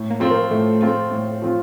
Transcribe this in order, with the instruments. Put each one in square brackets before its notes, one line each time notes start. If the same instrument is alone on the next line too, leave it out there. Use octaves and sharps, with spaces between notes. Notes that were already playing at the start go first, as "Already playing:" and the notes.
Already playing: [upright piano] A2
[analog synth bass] A#3
[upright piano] F3 C4 F4
[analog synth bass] A#3
[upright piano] A2 [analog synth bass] A3
[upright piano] F3 C4 F4
A2
F3 C4 F4